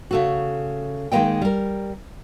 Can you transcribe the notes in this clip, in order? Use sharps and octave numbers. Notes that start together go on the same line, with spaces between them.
C#3 A3 F#4
D#3 G#3 A#3 B3 D#5 G5
G3 A#4